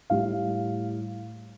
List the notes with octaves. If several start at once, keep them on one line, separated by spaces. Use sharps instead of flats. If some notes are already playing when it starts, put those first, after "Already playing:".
A2 G3 F5